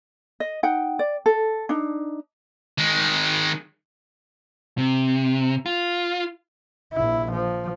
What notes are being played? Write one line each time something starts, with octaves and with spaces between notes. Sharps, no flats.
D#5
D#4 F#5 G5
D5
A4
D4 D#4
D#3 G#3
C3
F4
A#1 E4
F3